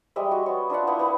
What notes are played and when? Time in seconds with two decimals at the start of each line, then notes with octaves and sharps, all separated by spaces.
0.16 G3 G#3 D#5 E5
0.31 F#4
0.46 B3 C#5
0.70 D4 F4 E5 F#5
0.87 A#3 B3 E4
0.99 B3 B4